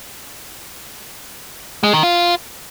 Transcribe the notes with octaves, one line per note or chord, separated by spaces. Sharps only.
G#3
D#3
F4